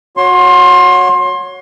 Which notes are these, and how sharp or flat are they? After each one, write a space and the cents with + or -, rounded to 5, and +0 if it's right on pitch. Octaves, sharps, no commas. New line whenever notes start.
F#4 -25 C#5 +0 C6 +25